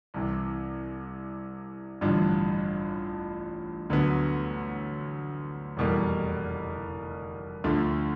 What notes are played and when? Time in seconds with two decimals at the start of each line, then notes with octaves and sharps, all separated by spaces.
0.14 C2 C3 E3
2.01 A1 G2 D3 F3
3.90 D2 D3 F#3 B3
5.77 F1 E2 B2 G3 A#3
7.64 D2 D3 F3 A3